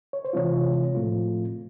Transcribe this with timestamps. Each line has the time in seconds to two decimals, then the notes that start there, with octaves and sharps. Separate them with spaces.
0.13 C#5
0.25 C5
0.33 C3 E3 G#3 C4 F4 C#5
0.95 A2 F3 A3 C4 F4